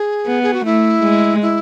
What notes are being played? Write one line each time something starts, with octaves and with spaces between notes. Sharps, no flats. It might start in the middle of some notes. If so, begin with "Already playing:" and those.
Already playing: G#4
B3
G#4
F#4
A3 E4
G#3
E4